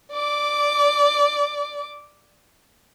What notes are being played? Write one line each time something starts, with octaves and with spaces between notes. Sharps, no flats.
D5 D6